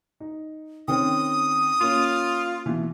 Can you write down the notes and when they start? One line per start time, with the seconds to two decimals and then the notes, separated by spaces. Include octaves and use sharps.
0.20 D#4
0.88 D#3 C4 C#4 D#6
1.81 A#3 C#4 F4
2.66 B2 E3